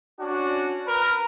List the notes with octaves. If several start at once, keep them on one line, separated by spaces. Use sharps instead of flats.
C#4 D4 F#4
A#4 B4